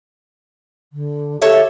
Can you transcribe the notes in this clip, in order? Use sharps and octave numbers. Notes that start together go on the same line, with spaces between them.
D3
G4 A4 C#5 E5